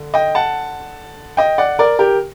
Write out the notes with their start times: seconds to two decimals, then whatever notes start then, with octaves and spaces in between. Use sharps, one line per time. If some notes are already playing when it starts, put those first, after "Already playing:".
Already playing: D3
0.14 D#5 G5
0.35 F#5 A5
1.37 D#5 G5
1.58 D5 F#5
1.79 A#4 D5
1.99 G4 A#4